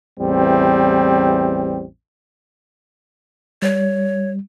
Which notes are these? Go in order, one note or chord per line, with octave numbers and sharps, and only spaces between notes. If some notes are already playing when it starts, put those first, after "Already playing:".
A1 E2 G3 C4
G3 C#5